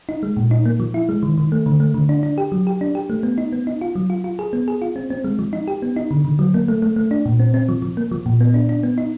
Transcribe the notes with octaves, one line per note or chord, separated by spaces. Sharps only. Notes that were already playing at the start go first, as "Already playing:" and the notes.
D#4
G#3
A#2
D#4
A#3
F3
E4
G#3
D#3
D#3
A3
D3
A3
D3
D4
D4
G4
F#3
G4
D4
G4
A3
B3
D#4
B3
D#4
F4
F#3
F4
F4
G#4
B3
G#4
F4
C4
C4
G#3
F3
D#4
G4
B3
D#4
D3
D3
F#3
A#3
A3
A3
A3
D4
A#2
C4
C4
F3
F3
A#3
F3
A#2
B3
D4
D4
B3
D#4